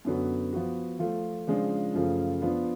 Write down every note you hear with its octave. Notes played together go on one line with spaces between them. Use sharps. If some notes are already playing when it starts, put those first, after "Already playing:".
F#2 D3 F#3 B3 F#4
F3 B3 F#4
F3 A3 F4
C#3 F3 G#3 D4 F4
F#2 C#3 F3 A3 F4
F3 B3 D4 F4